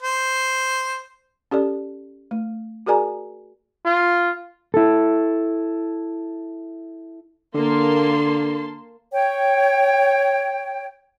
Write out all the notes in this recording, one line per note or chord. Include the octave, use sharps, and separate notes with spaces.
C5
C#4 G4 A4 D5
A3
F#4 G#4 A#4 D5 G#5 A#5
F4
E4 A4
D3 A#3 A5 C6
C#5 G5